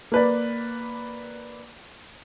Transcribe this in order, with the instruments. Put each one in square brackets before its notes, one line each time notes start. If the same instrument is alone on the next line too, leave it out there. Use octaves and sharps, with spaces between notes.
[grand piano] A#3 B4 D5